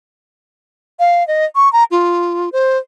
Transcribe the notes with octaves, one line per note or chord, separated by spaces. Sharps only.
F5
D#5
C#6
A#5
F4
C5